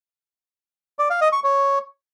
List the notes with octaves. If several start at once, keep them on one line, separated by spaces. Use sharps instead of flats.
D5
F5
D#5
C#6
C#5